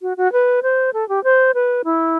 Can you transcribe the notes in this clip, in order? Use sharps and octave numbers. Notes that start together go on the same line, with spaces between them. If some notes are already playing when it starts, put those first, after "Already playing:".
F#4
F#4
B4
C5
A4
G4
C5
B4
E4